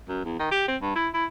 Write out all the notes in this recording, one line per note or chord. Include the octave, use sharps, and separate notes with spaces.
F#2
E2
D#3
G4
C4
G2
E4
E4